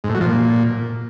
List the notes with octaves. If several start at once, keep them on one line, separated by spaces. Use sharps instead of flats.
G#2
A2
F#3
F3
A#2